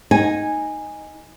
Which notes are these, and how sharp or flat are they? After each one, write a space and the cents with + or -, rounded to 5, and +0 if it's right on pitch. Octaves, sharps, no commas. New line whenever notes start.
D#4 +0 G#5 -10